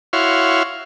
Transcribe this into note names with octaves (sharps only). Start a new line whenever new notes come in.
E4 F#4 C#5 F5 C6